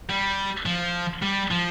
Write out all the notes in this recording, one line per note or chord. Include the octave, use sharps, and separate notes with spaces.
G3
F3
G3
F3